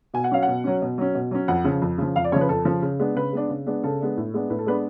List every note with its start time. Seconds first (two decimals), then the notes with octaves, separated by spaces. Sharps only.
0.14 B2 G#5
0.24 F#5
0.31 F#3 C#4 F5
0.43 F#5
0.48 B2
0.64 F#3 C#4
0.82 B2
0.98 F#3 C#4
1.15 B2
1.31 F#3 C#4
1.48 F2 F#5
1.64 C#3 F3
1.82 F2
1.98 C#3 F3
2.16 F2 F5
2.24 D5
2.32 C#3 F3 C#5
2.41 B4
2.49 F2 A4
2.65 C#3 F3
2.82 C#3
2.99 G#3 B3 D4
3.15 C#3 B4
3.33 G#3 B3 D4
3.49 C#3
3.66 G#3 B3 D4
3.83 C#3 A4
4.01 G#3 B3 D4
4.17 A2
4.34 G#3 B3 D4
4.50 A2 B4
4.58 A4
4.67 G#3 B3 D4 B4